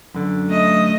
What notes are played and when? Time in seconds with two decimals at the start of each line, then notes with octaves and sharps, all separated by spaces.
0.15 F#2 D3
0.47 A3 D#5